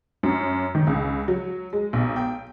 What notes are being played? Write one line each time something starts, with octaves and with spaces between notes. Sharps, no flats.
F#2
D#3
C#2
F#3
G#3
B1
G5